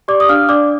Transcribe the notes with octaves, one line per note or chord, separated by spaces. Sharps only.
G4 D5 D6
D#6
D4 F5 F6
D4 D5 D6